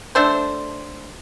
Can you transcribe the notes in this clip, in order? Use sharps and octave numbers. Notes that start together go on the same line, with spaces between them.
A3 D4 A4 C5